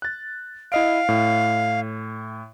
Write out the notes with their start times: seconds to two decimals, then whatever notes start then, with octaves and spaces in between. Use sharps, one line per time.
0.02 F#6 A6
0.72 E4 D#5 F5 D7
1.09 A2